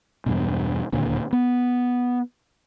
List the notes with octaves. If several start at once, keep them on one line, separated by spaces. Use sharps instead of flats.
E2 G2 B2
D1 D#2 A#2 D3
B3